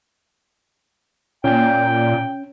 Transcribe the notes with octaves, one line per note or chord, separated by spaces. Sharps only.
A#2 C#4 G5